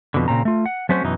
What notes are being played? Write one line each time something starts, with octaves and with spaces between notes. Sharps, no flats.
F2 B2 D3
A#2 C#3 C4 A#5
A3 F4
F#5
F#3 A3 C4 C#4 F#4 C5
F#2 B2 E3 D#4